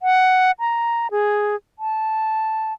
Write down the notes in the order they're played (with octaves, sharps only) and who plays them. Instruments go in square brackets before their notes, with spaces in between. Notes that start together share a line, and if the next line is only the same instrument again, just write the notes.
[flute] F#5
A#5
G#4
A5